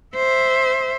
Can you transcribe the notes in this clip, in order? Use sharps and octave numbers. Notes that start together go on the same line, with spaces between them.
C5 E5